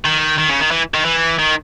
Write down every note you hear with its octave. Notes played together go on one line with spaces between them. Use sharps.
D#3
D#3
C#3
D#3
E3
D#3
E3
D#3